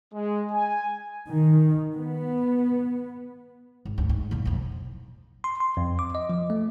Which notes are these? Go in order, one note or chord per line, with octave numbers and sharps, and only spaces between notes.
G#3
G#5
D#3
B3
G#1
D2 G2
G#2
F#2 A#2
B1 F2
C6
C6
F2
D6
D#5
F3
A3